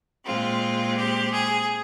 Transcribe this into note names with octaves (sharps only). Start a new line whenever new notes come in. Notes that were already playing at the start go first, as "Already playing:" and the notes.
A#2 G#3 C4 F4
G4
G#4